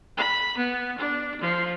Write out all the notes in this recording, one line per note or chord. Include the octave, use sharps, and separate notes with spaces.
B5
B3
D4
F3